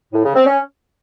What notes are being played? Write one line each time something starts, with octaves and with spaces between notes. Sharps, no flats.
A2
C#3
C4
C#4